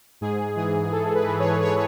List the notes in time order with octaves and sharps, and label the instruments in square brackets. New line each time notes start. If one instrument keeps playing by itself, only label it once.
[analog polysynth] G#2 G#4
E3 G#4
G#2 A4
B4
E3
C#5
C#5